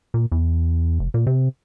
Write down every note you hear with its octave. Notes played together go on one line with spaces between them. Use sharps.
A#2
E2
F1
A#2
C3